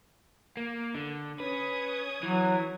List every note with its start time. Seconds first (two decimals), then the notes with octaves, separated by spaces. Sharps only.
0.57 A#3
0.95 D3
1.40 C#4 B4 D#6 G#6
2.23 E3 F#3